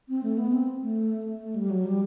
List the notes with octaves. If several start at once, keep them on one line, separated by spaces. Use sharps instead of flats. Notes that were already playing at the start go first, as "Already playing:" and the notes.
C4
A3
B3
C4
A3
G3
F#3
G3